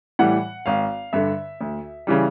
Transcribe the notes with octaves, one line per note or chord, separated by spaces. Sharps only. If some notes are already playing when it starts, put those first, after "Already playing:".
A2 E3 G3 F#5
G#1 F5
G2 D3 E5
D2
C#3 E3 G3